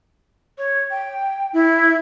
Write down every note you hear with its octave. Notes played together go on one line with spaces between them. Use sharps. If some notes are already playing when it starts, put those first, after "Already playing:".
C#5
G5
E4